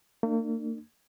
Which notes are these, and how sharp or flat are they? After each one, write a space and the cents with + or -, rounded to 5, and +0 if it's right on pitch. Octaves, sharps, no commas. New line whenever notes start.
A#3 -40 D4 +35